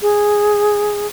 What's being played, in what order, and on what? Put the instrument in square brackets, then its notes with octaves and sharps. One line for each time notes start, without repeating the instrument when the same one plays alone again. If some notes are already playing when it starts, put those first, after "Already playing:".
[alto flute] G#4